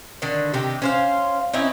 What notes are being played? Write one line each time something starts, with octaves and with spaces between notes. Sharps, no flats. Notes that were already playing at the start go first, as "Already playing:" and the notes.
D3 D#3
C3 D#3 G4
C#4 C5 F5
C4 C#4 D#4 E4